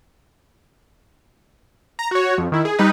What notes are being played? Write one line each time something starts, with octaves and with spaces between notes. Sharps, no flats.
A#5
F#4 C#5
F2
D#3 E4
G#4
G3 D#4 B4